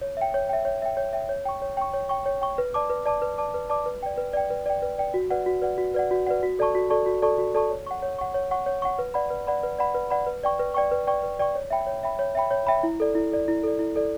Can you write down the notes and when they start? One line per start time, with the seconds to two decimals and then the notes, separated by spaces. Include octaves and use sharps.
0.01 C#5
0.17 E5 G5
0.34 C#5
0.49 E5 G5
0.65 C#5
0.82 E5 G5
0.97 C#5
1.13 E5 G5
1.29 C#5
1.45 G5 C#6
1.62 C#5
1.77 G5 C#6
1.94 C#5
2.09 G5 C#6
2.26 C#5
2.41 G5 C#6
2.58 B4
2.74 D5 A5 D6
2.90 B4
3.06 D5 A5 D6
3.22 B4
3.38 D5 A5 D6
3.54 B4
3.70 D5 A5 D6
3.86 B4
4.03 D5 G5
4.17 B4
4.33 D5 G5
4.50 B4
4.66 D5 G5
4.82 B4
4.98 D5 G5
5.14 F#4
5.30 B4 D5 F#5
5.46 F#4
5.62 B4 D5 F#5
5.78 F#4
5.94 B4 D5 F#5
6.11 F#4
6.27 B4 D5 F#5
6.43 F#4
6.59 A4 D5 A5 C#6
6.75 F#4
6.90 A4 D5 A5 C#6
7.06 F#4
7.22 A4 D5 A5 C#6
7.38 F#4
7.55 A4 D5 A5 C#6
7.70 C#5
7.87 F#5 C#6
8.02 C#5
8.18 F#5 C#6
8.34 C#5
8.51 F#5 C#6
8.66 C#5
8.82 F#5 C#6
8.99 B4
9.14 D5 F#5 B5
9.30 B4
9.47 D5 F#5 B5
9.63 B4
9.78 D5 F#5 B5
9.95 B4
10.11 D5 F#5 B5
10.27 B4
10.43 D5 G5 C#6
10.59 B4
10.74 D5 G5 C#6
10.91 B4
11.07 D5 G5 C#6
11.23 B4
11.39 D5 G5 C#6
11.55 C#5
11.70 E5 G5 B5
11.87 C#5
12.03 E5 G5 B5
12.19 C#5
12.35 E5 G5 B5
12.51 C#5
12.67 E5 G5 B5
12.83 E4
13.00 A4 D5
13.15 E4
13.32 A4 D5
13.48 E4
13.64 A4 D5
13.79 E4
13.96 A4 D5